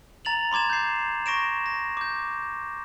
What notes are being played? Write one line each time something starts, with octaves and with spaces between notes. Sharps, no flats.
A#5 A6 F7 F#7
B5 C6 D6 G#6 E7
G6 C7
C#6 A#6 D7 E7
A#6
D6 G6